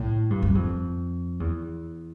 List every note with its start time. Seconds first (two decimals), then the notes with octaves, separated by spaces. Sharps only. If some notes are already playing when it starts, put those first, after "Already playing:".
Already playing: A2
0.30 G2
0.42 F#2
0.55 F2
1.40 E2